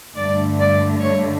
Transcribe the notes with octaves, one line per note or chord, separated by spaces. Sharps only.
G2 D3 A3 D5
D5
C#5